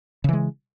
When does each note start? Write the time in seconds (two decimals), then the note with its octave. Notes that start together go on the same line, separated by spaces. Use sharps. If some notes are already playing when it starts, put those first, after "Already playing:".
0.24 C#3
0.29 E3
0.33 G#3